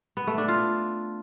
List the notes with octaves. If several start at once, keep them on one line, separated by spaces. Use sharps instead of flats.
B3
A3
D4
F4